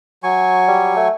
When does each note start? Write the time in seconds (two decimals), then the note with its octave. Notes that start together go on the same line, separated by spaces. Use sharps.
0.23 F#3 G#5 C#6
0.68 G3
0.97 A3